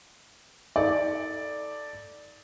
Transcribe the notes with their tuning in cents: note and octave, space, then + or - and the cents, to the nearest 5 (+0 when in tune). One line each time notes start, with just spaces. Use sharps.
D#4 +35 A4 +0 D5 +0